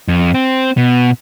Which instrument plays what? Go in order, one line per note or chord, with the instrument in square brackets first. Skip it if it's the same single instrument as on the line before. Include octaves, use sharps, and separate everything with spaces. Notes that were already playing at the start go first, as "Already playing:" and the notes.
[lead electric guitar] F2
C4
B2